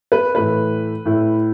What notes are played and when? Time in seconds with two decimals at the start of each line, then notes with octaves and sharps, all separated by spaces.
0.12 B4
0.35 A2 E3 A3 B4
1.05 A2 A3 E4